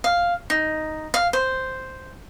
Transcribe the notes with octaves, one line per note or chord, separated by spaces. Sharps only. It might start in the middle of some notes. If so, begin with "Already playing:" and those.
F5
D#4
F5
C5